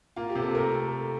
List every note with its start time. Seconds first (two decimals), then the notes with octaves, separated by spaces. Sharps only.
0.16 A#3 F4
0.29 G4
0.35 C3
0.42 A4
0.55 A3 A#4